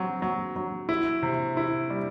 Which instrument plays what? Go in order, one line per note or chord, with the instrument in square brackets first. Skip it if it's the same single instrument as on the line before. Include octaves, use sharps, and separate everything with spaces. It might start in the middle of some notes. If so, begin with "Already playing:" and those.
Already playing: [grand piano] F#3 C4
F#3
F#3
E4
C3
E4
G3